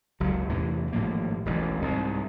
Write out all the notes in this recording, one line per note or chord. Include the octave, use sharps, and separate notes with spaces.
F#1 C#2 F#3
E2 A2 C3 E3
G#1 A2 F3 A#3
E1 A1 E2
C2 G#2